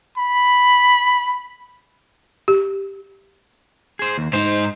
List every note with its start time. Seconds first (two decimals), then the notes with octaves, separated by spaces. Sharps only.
0.18 B5
2.48 G4
3.99 G#4 C5
4.18 D#2
4.33 G#2 D#4 C5